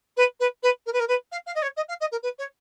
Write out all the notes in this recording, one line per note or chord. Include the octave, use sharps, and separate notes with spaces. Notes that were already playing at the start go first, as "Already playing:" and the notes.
B4
B4
B4
A#4
B4
A#4
B4
F5
F5
D#5
C#5
D#5
F5
D#5
A#4
B4
C#5